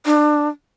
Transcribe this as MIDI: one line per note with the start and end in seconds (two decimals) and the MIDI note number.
0.06 0.48 62